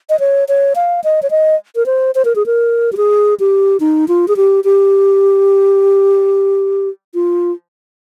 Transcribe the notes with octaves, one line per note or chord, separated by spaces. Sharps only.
D#5
C#5
C#5
F5
D#5
C#5
D#5
A#4
C5
C5
A#4
G#4
A#4
G4
G#4
G4
D#4
F4
G#4
G4
G4
F4